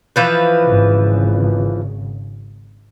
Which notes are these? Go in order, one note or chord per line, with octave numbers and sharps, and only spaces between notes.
E3 F3 B4
G#1 C#3